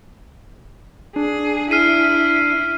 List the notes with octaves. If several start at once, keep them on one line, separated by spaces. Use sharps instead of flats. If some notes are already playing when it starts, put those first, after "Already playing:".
D4 G#4
E4 F6 C7 D#7